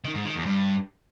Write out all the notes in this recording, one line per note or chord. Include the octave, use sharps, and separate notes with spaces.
D#3
G#2
D#3
E2
G2